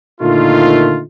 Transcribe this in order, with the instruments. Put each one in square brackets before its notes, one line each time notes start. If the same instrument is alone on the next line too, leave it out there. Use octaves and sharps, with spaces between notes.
[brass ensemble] A#2 D3 D#3 A3 D#4 F4